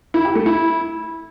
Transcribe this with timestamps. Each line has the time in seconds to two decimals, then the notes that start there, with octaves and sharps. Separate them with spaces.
0.14 E4
0.25 G4
0.35 A3
0.46 E4